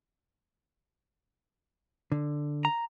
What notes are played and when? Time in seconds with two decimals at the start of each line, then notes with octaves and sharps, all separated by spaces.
2.12 D3
2.65 A#5